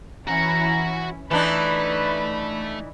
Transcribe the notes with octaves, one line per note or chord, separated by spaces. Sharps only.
E3 C#4 E4 F#4 F#5 A#5
E3 A3 D4 D#4 B4 B5